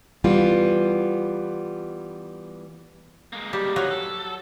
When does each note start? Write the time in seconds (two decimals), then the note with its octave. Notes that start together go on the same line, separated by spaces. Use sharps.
0.24 E3 G3 B3 F4
3.33 G#3 A#3
3.53 G3
3.76 F3 F#3 D#4
3.91 A4